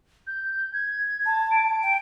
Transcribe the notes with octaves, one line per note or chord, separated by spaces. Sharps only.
G6
G#6
A5
D7
G5